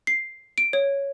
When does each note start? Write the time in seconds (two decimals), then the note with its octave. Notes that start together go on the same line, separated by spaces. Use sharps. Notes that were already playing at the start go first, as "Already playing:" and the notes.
0.07 C7
0.58 D7
0.73 C#5